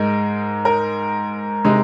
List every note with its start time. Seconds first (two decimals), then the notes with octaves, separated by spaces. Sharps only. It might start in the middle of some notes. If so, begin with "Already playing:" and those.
Already playing: G#2 G#3 D#4 A#4
0.65 A#4
1.64 C3 G#3 D#4